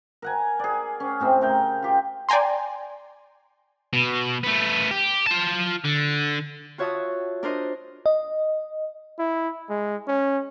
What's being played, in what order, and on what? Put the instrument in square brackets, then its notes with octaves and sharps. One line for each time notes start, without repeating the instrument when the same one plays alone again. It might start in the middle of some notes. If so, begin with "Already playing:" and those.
[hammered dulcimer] A#4 F#5 G#5
G#4 D5
C#4
A2 C3 C4
C#3 A#4 G5
F4 G4
[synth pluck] D5 G5 G#5 A#5 C6
[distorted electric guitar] B2
A3 B3
G4
F4 A5
D3
[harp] F4 F#4 C#5 E5 A5 D#6
D4 A#4 C5 D#5
[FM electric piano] D#5
[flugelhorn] E4
G#3
C#4